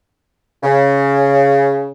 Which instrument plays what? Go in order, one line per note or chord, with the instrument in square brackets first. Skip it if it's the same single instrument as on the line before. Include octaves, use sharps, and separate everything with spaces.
[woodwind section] C#3